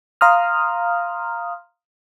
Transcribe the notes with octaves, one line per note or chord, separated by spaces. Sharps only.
F5 A#5 C6 D#6 F6